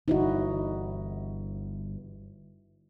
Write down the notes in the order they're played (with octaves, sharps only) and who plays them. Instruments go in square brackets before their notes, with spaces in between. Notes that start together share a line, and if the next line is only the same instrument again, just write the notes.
[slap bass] G1 E3 [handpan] D#4 E4 F#4